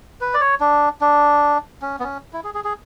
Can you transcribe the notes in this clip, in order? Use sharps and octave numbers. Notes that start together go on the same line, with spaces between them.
B4
D5
C#5
D4
D4
C#4
B3
C#4
E4
G#4
G#4
G#4